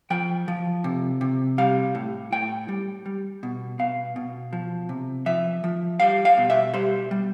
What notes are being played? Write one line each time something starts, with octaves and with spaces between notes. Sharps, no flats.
F3 G5
F3
C3
C3
G3 F5
A2
A2 G5
G3
G3
B2
B2 F5
B2
F3
C3
F3 E5
F3
G3 F5
F5
B2
E5
G3 C5
G3